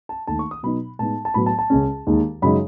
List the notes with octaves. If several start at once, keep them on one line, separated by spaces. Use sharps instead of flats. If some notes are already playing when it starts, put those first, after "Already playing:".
A5
D#2 D#3 A3 A5
C#6
D#6
B2 F#3 B3 D#4 B5
A2 G#3 B3 D#4 A5
A5
A2 F#3 B3 B5
A5
A5
C#2 C#3 G#3 C#4
D#2 D#3 G#3
F#2 C#3 G#3 D#4 B5